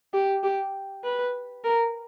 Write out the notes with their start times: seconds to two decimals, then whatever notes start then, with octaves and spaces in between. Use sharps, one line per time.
0.13 G4
0.43 G4
1.04 B4
1.64 A#4